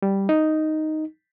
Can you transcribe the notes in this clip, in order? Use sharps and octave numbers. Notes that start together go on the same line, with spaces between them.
G3
D#4